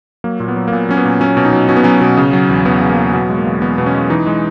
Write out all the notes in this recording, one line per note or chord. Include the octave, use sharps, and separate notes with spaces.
F#3 A#3
A#2
B3
F#3
A#3
A#2 B3
F#3 C#4
B3
A#2
F#3 C#4
B2
D#4
F#3
B2 C#4
B3
F#3 C#4
B2
C#3
F#3
E2
E2 B3
C#3
A#3
F#3
B2 B3
G#3
A#3
E2
E2 B3
B2
C#4
G#3
E3 D#4
G#3